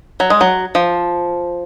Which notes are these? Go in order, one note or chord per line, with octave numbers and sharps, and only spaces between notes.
F#3
G#3
F#3
F3